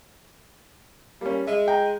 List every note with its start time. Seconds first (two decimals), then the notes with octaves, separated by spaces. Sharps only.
1.21 G3 A#3 C#4
1.47 G#3 E5
1.68 G5 A#5